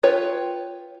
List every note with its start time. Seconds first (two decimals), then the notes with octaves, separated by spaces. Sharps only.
0.03 F4 B4 C#5 G5